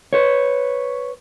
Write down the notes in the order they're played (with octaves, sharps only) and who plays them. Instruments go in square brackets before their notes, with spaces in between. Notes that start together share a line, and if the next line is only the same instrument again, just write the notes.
[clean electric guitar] B4 C#5